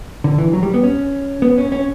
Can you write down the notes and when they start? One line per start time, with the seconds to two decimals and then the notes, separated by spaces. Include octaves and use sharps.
0.24 D3
0.38 E3
0.53 F#3
0.63 G3
0.74 B3
0.84 C#4
1.42 B3
1.58 C#4
1.72 C#4